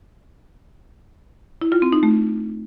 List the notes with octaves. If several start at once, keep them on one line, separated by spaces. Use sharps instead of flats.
E4
F4
C4
D#4
A3